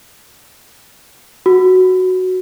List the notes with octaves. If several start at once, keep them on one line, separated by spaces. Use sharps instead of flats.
F#4